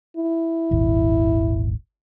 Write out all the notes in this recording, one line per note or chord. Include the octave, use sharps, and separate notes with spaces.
E4
D#1 G#1